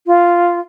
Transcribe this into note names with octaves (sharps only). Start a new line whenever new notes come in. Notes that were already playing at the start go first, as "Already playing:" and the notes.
F4